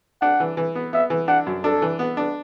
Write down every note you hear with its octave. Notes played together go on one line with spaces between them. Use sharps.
D4 F#5
E3
E3
B3
B3 E5
E3
D4 F#5
F#2
D4 A4
E3
B3
D4